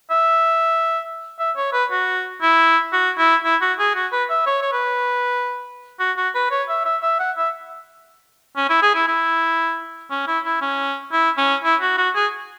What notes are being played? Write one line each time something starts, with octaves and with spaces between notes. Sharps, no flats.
E5
E5
C#5
B4
F#4
E4
F#4
E4
E4
F#4
G#4
F#4
B4
E5
C#5
C#5
B4
F#4
F#4
B4
C#5
E5
E5
E5
F#5
E5
C#4
E4
G#4
E4
E4
C#4
E4
E4
C#4
E4
C#4
E4
F#4
F#4
G#4